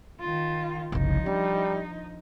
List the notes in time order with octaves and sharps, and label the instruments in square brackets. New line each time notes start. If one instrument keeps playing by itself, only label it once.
[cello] D#3 F4
[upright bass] F#1 C2 [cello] F3 D#4
[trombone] G3 [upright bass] D4